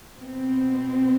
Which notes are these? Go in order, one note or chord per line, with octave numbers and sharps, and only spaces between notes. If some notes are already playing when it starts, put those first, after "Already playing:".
B2 B3 C4